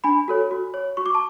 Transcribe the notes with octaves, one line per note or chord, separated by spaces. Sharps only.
D4 G#5 B5
F#4 A4 C#5
F#4
C#5
F#4 C#6
D6
A5